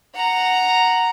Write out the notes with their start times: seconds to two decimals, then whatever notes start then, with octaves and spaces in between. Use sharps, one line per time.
0.16 F#5 A#5